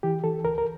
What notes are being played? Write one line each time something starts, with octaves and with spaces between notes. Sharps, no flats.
E3 G4
E3 A4
D2 A#4
A#4